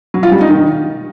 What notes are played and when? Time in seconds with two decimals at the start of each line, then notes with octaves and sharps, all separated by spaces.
0.14 F#3
0.23 F4
0.32 G3
0.41 D#4
0.49 D#3